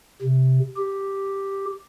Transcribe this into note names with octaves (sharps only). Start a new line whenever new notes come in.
C3
G4